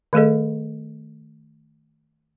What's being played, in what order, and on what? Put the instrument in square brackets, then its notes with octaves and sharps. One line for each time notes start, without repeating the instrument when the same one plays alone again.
[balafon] D#3 A3 G#4 A4 D#5